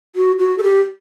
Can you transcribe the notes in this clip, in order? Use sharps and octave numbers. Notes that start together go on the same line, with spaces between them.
F#4
F#4
A4
G4